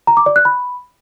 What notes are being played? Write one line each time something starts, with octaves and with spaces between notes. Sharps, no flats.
A#5
D6
D5
F#6
B5